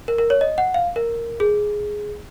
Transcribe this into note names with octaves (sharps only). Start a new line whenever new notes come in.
A#4
A#4
C#5
D#5
F#5
F5
A#4
G#4